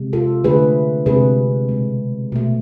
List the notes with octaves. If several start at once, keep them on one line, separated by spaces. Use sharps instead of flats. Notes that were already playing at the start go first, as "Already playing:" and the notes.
Already playing: C3 G#3
F4 A4
D3 A3 G#4 B4
C3 G#3 G#4 B4
B2 G#3
B2 A3